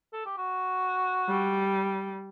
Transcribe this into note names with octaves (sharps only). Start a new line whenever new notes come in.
A4
G4
F#4
G3